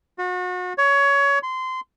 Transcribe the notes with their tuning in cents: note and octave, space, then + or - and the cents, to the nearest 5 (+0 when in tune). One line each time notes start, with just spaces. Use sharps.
F#4 -35
C#5 +20
C6 -20